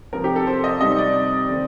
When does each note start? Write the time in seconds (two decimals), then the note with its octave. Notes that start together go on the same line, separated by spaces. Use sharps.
0.13 C3 F3 C4 A#4
0.24 G4
0.36 A4
0.47 C5
0.64 D#5
0.80 C3 G3 C4 D#4 D#5
0.98 D5
1.49 D#3 A3 C4